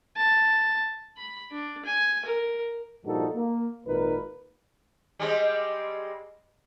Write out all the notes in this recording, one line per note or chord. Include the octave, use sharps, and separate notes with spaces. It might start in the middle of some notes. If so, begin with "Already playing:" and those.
A5
B5
D4
G#5
A#4
G2 A#2 F3 D#4 F#4 A4
A#3
G#1 A#2 D#4 A#4 B4
G3 G#3 C4